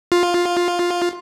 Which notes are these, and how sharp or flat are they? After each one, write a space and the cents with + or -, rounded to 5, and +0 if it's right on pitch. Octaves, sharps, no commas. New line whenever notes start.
F4 +10